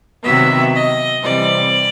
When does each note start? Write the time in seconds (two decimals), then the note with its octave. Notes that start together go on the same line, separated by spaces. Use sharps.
0.23 C3 D#3 F#3 B3 E5
0.73 D#5
1.22 C3 E3 G3 C4 D5